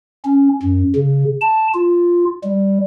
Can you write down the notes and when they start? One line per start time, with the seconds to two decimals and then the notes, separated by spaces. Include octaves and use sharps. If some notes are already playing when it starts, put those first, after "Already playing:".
0.25 C#4
0.63 F#2
0.95 C#3
1.41 A5
1.74 F4
2.43 G3